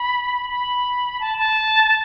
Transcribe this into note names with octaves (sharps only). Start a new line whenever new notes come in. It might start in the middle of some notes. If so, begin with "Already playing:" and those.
Already playing: B5
B5
A5
A5